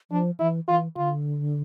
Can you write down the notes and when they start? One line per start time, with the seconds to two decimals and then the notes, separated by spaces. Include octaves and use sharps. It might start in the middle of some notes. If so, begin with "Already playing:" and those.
0.11 F3 D4
0.39 E3 E4
0.68 E3 F4
0.97 D3 F4